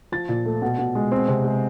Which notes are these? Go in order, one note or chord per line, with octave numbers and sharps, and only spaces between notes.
F3 A6
A#2
A3
B2
B2
G#3
C4
C3
G#3